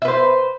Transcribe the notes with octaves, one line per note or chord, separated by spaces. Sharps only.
B4 C5 E5